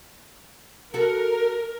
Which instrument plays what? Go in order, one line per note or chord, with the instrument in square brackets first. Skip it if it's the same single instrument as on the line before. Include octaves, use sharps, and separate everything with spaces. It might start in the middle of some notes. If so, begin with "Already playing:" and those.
[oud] F#4 A4 [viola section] A#4